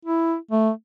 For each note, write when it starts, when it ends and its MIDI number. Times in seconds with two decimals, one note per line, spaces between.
0.05 0.35 64
0.51 0.70 57